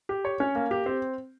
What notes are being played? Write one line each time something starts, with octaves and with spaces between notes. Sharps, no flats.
G4
C#5
C#4
A#3
G4
C4